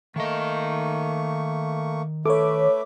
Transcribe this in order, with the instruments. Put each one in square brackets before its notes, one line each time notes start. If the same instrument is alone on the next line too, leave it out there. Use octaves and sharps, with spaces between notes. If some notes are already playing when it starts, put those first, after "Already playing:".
[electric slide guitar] D#3 D#5 [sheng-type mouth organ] A3 A#3 C#6
[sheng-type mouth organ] A3 B4 E5 [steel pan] A4 [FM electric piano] C#5 D6